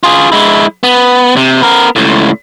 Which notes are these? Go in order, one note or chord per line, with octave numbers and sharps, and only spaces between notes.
F4 G#4
G#3 E4
B3
C3
B3 A#4
C#2 A2